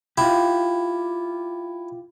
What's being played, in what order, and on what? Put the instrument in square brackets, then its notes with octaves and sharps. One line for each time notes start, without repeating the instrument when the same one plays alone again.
[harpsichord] E4 [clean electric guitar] F4 G4